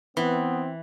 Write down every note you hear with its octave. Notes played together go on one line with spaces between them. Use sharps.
E3 B3 C4 B4